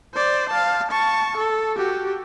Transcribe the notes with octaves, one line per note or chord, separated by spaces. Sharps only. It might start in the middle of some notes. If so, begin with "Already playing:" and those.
C5 D5
F5 A5
A5 C#6
A4
F#4 G4